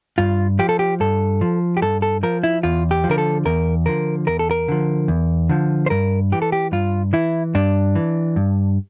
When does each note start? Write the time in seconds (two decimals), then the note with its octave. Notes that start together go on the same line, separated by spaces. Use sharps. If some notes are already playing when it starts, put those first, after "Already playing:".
0.18 G2 F4
0.59 F3 G4
0.69 A4
0.79 G4
1.00 G2 A4
1.41 F3
1.77 G4
1.82 G2 A4
2.02 A4
2.23 F3 A#4
2.43 E4
2.63 E2 F4
2.91 G4
3.04 F3
3.09 D3 A#4
3.18 A4
3.45 E2 A#4
3.86 D3 F3 A#4
4.27 E2 A#4
4.39 A4
4.51 A#4
4.68 D3 F3
5.08 E2
5.50 D3 F3
5.86 C5
5.90 G2 A#4
6.32 E3 G4
6.42 A4
6.52 G4
6.72 G2 F4
7.13 E3 E4
7.55 G2 D4
7.95 E3
8.36 G2